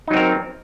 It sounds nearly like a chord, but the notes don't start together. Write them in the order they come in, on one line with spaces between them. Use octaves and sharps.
D#4 F#3 C4 A#4